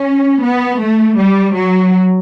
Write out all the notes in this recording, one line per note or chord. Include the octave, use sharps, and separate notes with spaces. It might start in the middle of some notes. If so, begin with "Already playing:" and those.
Already playing: C#4
B3
A3
G3
F#3